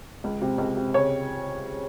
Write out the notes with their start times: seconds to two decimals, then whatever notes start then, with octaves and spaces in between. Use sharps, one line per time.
0.24 C#2
0.42 C3
0.58 C#2
0.77 C3
0.94 C#3 C#5